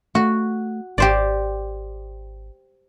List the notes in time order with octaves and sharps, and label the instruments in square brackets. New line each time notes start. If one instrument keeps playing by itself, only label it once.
[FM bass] A3 [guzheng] F#4
[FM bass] G#1 [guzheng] G4 C5 D5